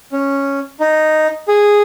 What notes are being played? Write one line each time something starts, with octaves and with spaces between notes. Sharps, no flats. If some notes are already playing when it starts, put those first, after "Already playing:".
C#4
D#4
G#4